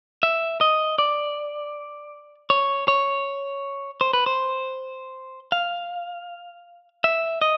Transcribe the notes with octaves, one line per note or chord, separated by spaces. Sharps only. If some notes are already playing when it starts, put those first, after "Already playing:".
E5
D#5
D5
C#5
C#5
C5
B4
C5
F5
E5
D#5